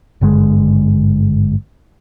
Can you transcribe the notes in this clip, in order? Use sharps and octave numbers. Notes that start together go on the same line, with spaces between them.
G#1 G2 D3 G#3